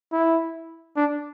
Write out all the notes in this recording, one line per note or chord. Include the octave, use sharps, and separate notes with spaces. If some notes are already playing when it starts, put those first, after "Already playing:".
E4
D4